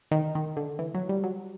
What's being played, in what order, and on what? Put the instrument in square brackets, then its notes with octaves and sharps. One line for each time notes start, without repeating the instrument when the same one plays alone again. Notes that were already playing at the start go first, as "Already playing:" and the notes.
[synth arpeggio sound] D#3
D#3
D3
E3
F#3
G3
F#3